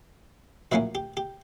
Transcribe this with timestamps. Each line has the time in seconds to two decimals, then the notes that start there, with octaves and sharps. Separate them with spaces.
0.72 A#1 A2 F#3 A#3 C#4 F#4
0.95 G4
1.17 G4